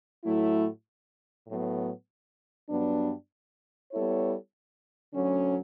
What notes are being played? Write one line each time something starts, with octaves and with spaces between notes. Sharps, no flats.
A2 F#3 A3 E4
A2 F#3 B3
G2 F#3 B3 D4
G3 B3 E4 A4 C#5
D2 D3 F#3 C#4